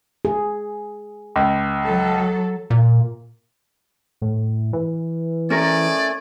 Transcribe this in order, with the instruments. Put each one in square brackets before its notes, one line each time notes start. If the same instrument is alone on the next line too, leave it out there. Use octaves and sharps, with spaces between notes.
[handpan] G#4
[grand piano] C#2
[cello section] F#3 A4
[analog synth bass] A#2
A2
E3
[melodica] A3 G#5 [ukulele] C#4 A#4 [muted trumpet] D5